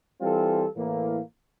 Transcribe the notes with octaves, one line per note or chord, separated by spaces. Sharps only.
E3 G3 C4 F4 A4
A2 E3 A#3